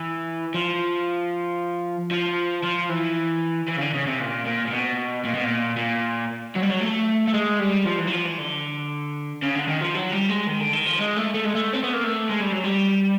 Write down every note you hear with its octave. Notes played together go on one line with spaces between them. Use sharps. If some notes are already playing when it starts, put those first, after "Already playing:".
Already playing: E3
F3
F3
F3
E3
E3
C#3
D3
C#3
C3
A#2
A#2
A#2
B2
A#2
B2
A#2
A#2
F#3
G3
F#3
A3
A3
G#3
G3
F3
E3
F#3
F3
E3
D3
C#3
D3
D#3
F3
F#3
G3
G#3
D#3
D3
D#3
F3
G#3
A3
A3
G#3
A3
C4
B3
A#3
A3
G#3
G3
F#3
G3